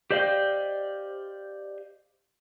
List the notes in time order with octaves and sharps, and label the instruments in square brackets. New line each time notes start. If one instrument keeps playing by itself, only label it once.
[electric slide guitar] G4 C5 D5 D#5 F5 G5